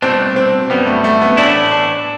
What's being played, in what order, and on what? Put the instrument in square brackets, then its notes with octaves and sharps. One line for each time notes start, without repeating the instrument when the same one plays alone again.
[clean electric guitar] C2 B2 A3 D4 [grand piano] C4
[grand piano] C4
[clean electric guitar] F#2 D3 G3 [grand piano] B3
[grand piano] A3
A3
B3
[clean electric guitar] A2 E3 A3 E4 [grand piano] D4
[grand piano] D4